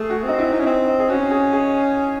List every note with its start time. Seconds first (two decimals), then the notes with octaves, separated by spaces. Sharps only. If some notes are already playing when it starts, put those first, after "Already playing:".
Already playing: A3 G#4
0.10 F#4
0.24 C4 D#4
0.38 E4
0.53 D#4
0.60 C#4
0.66 C4 D#4
0.88 D#4
0.99 G#4
1.10 C#4 F#4
1.31 G#4
1.53 G#4